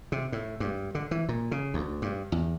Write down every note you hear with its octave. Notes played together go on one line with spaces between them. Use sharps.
C3
A2
G2
D3
E3
A#2
C#3
D2
G2
E2